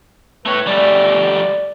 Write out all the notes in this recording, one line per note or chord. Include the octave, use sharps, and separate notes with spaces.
A3 B4 C#5
G3 A3 D5